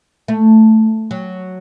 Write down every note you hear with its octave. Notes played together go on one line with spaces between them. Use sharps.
A3
F#3